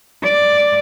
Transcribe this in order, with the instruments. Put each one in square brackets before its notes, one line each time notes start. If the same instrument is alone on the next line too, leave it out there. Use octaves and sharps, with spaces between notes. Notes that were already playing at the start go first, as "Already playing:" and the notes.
[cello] D5